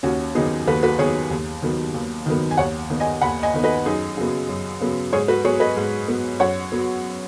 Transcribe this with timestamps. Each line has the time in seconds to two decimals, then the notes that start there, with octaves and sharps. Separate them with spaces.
0.03 D#2 C#4 F#4
0.35 D#3 F#3 B3 D#4 G#4
0.67 D#2 F#4 B4
0.83 F#4 B4
0.99 D#3 F#3 B3 G#4 C#5
1.31 D#2
1.62 D#3 F#3 B3
1.94 D#2
2.26 D#3 F#3 B3
2.51 G#5
2.57 D#2 C#5 F#5
2.90 D#3 B3
3.00 D#5 G#5
3.21 D#2 F#5 B5
3.43 D#5 G#5
3.54 D#3 B3
3.64 B4 D#5
3.86 F#2 D#4 G#4
4.17 C#3 F#3 B3
4.49 F#2
4.81 C#3 F#3 B3
5.13 G#2 G#4 C#5
5.28 F#4 B4
5.44 F#3 B3 G#4 C#5
5.60 B4 D#5
5.77 G#2
6.08 F#3 B3
6.40 F#2 C#5 F#5
6.72 F#3 B3